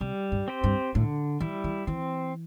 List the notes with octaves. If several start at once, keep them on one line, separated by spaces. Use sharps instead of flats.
C3 G3
G2
C4 G4 C5
G2
A2 D3
E3 G3 E4
E3
E3 C4